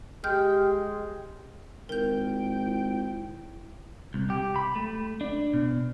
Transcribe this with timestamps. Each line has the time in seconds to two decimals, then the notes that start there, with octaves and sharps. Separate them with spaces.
0.24 G#3 G4 G5 F6 G6
1.89 G#1 E4 A#4 G5 G6
4.14 C2
4.30 G4
4.56 B5
4.76 A3
5.21 D4
5.53 B2